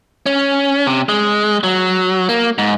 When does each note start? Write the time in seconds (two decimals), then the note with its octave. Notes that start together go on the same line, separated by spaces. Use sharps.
0.26 C#4
0.87 C3
1.09 G#3
1.64 F#3
2.29 A#3
2.58 G#2